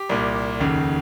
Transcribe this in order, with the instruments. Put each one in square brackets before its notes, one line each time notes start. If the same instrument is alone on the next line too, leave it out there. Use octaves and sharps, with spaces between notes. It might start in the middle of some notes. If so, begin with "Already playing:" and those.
Already playing: [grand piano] G4
C2 A#2
F1 D#2 C#3